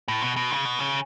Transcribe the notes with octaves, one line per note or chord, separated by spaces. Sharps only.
A2
B2
B2
C#3
B2
C#3